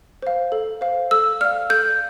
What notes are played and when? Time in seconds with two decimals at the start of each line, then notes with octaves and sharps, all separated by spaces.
0.22 C5 F5
0.52 A4
0.81 C5 F5
1.11 A4 E6
1.41 D5 F5 F6
1.70 A4 G6